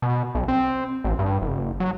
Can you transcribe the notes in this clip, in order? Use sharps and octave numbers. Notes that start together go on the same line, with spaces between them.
B2
B1
C4
A1
G2
F#1
F#3